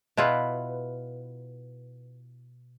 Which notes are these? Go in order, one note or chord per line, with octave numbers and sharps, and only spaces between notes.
B2 E4 F4 B4